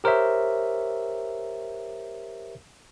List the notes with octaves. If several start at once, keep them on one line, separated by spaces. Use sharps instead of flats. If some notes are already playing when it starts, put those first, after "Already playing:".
G4 A#4 C5 C#5 E5